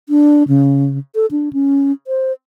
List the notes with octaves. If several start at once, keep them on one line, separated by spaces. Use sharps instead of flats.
D4
C#3
A4
D4
C#4
C5